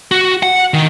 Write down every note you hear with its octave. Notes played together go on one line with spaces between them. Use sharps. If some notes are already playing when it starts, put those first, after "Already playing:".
F#4
F#5
D#3